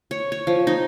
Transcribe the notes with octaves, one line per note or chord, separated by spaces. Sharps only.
C#5
C#5
F3
D#4